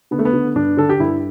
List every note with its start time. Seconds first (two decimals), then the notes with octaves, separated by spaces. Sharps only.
0.11 D3 B3
0.19 A3
0.25 B3
0.33 D3
0.55 G2 D4
0.77 D3 A4
0.89 G4
1.00 G2 E4